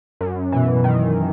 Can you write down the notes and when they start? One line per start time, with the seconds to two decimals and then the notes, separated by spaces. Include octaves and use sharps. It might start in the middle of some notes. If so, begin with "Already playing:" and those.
0.21 F#2
0.52 B2 E3
0.84 D#3